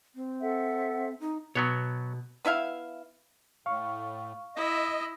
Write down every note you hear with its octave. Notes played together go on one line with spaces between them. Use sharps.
C4
A4 E5 F#5
D#4
B2 F#3 B3 C#5
B3 E4 E5 F5
A2 F5 C#6
E4 D#5